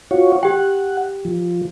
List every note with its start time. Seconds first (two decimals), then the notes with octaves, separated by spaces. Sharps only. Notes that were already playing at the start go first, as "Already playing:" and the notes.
0.11 F4 F#4 C#5
0.43 G4 F#5 G5
1.25 F3